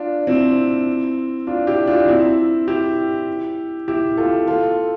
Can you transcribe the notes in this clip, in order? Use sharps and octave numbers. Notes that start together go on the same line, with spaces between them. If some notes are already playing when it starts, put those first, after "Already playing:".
Already playing: D4 F4
C4 E4
D4 F4
E4 G4
D4 F4
C4 E4
E4 G4
E4 G4
F4 A4
F4 A4